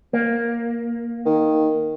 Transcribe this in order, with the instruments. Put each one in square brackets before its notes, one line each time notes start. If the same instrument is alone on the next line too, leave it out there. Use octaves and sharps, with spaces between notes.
[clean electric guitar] A#3
[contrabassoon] D#3